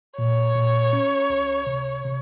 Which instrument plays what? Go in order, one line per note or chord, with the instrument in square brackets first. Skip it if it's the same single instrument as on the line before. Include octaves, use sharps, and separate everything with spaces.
[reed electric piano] A#2 [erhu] C#5
[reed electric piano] A#2
C#4
C#2
C3
C3